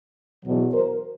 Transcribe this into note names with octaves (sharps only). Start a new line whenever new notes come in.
E2 B2 F#3
A#4 C5